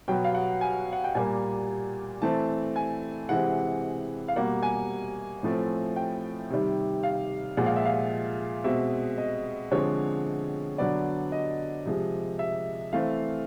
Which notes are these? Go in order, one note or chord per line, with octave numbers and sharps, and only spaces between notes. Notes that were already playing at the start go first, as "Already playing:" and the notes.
B2 F#3 B3 G5
F5
F#5
G#5
F#5
G5
A#2 G3 A#3 G#5
E3 A3 C4 A5
G#5
C3 E3 G#3 C4 F#5
F5
B2 G3 A#3 F#5
G#5
A2 F3 A3 C4
G5
C3 D#3 G3
F5
A#2 F3 G#3 F#5
F5
E5
F5
B2 G#3 C4 E5
D#5
D3 F3 G#3 C4 C#5
D3 F#3 B3 D5
D#5
C3 F3 G#3
E5
E3 A3 C4 F5